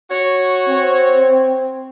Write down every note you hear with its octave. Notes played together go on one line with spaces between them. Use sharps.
F#4 C#5
C4